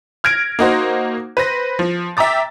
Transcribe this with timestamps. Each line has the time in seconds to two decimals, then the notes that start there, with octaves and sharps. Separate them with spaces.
0.24 F6 G#6 A#6 D7
0.59 A#3 D#4 F#4 C5
1.37 B4 C5 A#6
1.79 F3
2.17 E5 G5 A#5 D6 A6